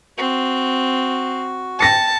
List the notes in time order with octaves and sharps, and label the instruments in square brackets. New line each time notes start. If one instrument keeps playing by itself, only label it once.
[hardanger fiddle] C4 [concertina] F#4
[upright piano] G5 A#6 C#7 [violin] A5